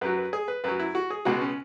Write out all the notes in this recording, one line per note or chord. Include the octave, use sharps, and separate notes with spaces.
F#2 F#3 B4
B4
G#4
B4
F#2 F#3 B4
E4
F#4
G#4
C#2 B2 G#3 F#4
C#4